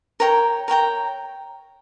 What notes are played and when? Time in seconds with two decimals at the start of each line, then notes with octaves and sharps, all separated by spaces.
0.20 A#4 C#5 G5 A#5
0.68 A#4 C#5 G5 A#5